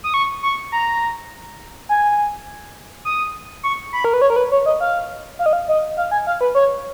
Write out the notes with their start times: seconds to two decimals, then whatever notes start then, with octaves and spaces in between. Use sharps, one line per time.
0.04 D#6
0.14 C#6
0.43 C#6
0.72 A#5
1.89 G#5
3.05 D#6
3.63 C#6
3.93 B5
4.04 A#4
4.14 B4
4.22 C#5
4.30 A#4
4.36 B4
4.52 C#5
4.66 D#5
4.80 F5
5.39 F5
5.46 D#5
5.53 F5
5.68 D#5
5.97 F5
6.11 G#5
6.27 F5
6.41 B4
6.55 C#5